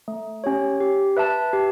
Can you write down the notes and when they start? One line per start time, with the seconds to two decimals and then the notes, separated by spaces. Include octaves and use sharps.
0.08 A3
0.44 C#4 G4 C#5
0.81 G4
1.17 B4 E5 A5
1.53 G4